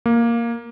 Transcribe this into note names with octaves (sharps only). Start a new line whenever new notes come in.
A#3